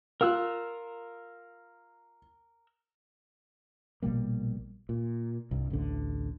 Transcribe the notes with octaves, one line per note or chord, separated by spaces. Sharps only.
F4 A#4 E6 F#6
A#1 B2 G3 A#3
A#2
C2 G2
A1 D2 D3